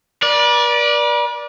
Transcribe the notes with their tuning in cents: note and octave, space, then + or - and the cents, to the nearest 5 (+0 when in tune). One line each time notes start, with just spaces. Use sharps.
B4 -45 D5 +0